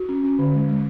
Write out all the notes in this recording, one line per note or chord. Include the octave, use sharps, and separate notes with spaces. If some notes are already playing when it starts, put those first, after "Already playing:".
Already playing: F#4
C#4
C#4
D3
G#3
G#3